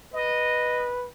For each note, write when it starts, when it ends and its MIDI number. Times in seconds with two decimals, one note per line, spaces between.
0.14 1.08 71
0.14 0.89 75